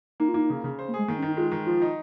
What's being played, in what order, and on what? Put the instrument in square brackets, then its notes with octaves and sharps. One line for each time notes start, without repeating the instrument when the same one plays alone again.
[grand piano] A#3 [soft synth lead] D#4
[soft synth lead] F4
[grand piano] A#3 [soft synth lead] D#4
[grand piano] C#3
C#3
C5
[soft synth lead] A#3
[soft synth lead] G#3 [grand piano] G#4
[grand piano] D#3 [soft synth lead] A#3
[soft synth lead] C#4
[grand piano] D#3 [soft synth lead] D#4
[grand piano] G#3 [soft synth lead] F4
[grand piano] D#3
[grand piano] F3 [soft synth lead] F4
[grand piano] D#4